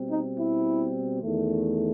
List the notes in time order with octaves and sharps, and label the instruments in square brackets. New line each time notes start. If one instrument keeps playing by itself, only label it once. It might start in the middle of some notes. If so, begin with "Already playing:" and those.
Already playing: [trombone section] B2 G3 C4
D#4
E4
E2 D#3 A3